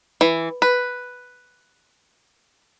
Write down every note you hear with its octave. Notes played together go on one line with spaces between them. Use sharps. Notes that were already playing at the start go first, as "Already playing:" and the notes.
E3
B4